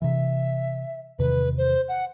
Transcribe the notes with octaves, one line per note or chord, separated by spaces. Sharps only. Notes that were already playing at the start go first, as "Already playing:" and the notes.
C3 E3 E5
E2 C3 D#3 B4
C5
F#5